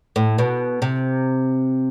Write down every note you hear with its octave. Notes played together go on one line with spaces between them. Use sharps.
A2
B2
C3